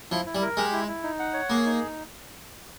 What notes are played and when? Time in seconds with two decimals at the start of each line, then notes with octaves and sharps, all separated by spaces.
0.11 F3 E4
0.26 E4
0.35 G3
0.42 A#4
0.57 G#3 G4
0.72 E4
0.88 E4
1.03 D#4
1.19 F#5
1.33 C#5
1.49 A#3 G#4
1.65 D#4